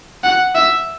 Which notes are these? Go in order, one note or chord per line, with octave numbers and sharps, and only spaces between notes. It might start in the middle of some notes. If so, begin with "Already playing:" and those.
F#5
E5